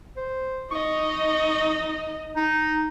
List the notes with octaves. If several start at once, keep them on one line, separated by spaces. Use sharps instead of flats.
C5
D#4 D#5 C#6
D#4